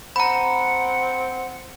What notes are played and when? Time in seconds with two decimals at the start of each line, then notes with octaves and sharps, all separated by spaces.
0.16 C4 F#5 A#5 B5